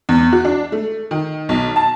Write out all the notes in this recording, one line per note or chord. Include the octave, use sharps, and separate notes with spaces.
E2
F#4
D4
A3
D#3
B1
A5